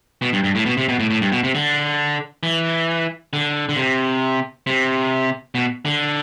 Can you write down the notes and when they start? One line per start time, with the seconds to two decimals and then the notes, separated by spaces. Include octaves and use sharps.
0.22 B2
0.33 G2
0.44 G2
0.55 A2
0.66 B2
0.77 C3
0.89 B2
0.99 A2
1.10 A2
1.21 G2
1.32 B2
1.43 C3
1.55 D3
2.43 E3
3.33 D3
3.69 D3
3.76 C3
4.67 C3
5.55 B2
5.85 D3